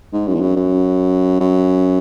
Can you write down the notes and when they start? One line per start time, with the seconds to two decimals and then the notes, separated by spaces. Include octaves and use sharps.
0.13 G#2
0.28 F#2
0.35 E2
0.41 F#2
0.56 F#2
1.41 F#2